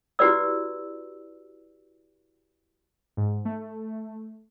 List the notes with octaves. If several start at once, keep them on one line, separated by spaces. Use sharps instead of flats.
E4 F#4 G4 B4 D5 E6
G#2
A3